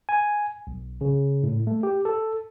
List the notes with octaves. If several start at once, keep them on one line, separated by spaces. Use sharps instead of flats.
G#5
B1
C#3
A2
A3
G4
A4